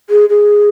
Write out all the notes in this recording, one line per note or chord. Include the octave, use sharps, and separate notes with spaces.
G#4
G#4